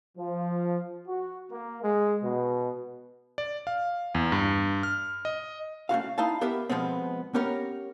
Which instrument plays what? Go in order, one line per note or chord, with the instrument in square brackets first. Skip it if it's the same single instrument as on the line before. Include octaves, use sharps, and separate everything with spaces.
[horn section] F3
F#4
A#3
G#3
B2
[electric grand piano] D5
F5
E2
G2
F6
D#5
[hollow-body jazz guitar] A3 C#4 F#4 F5
D#4 E4 F5 A5
B3 G4 A#4 E5
B2 F3 G#3 B3 C4
B3 C#4 G4 A#4 C#5